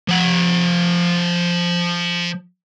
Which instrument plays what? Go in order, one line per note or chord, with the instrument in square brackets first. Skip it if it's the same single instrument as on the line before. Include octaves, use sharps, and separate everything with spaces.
[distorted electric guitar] F3 F#5